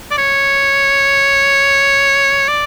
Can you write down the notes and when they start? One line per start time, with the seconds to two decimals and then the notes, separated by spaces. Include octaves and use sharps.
0.11 D5
0.18 C#5
2.48 D5